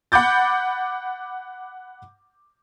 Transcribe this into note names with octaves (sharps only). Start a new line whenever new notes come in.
F#5 B5 D6 G6 A6